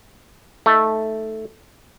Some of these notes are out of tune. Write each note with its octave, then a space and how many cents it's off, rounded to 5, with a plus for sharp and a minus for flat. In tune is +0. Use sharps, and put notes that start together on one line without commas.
A3 +0 D#4 +15